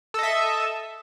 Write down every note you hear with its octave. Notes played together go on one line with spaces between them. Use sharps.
A4 D#5 E5